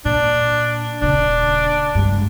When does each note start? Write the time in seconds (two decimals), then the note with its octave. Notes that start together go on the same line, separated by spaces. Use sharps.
0.05 A#2 D4
1.01 D#1 C#3 D4
1.95 G#1 G2